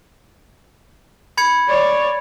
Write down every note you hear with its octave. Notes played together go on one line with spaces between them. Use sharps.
B5 G#6 C#7
C#5 D5